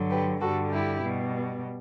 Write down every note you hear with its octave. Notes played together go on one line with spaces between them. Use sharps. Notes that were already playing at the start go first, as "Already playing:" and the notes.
Already playing: G2 D3 F#3
G4 B4
G2 D3 G3 F#4 A4
E4 G4
B2 G3